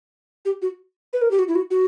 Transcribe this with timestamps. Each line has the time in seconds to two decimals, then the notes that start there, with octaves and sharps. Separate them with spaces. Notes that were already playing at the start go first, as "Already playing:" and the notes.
0.45 G4
0.62 F#4
1.13 B4
1.22 A#4
1.31 G4
1.39 F#4
1.48 E4
1.55 F#4
1.71 F#4